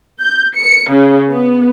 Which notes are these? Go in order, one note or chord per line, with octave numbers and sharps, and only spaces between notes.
G6
C#7
C#3
B3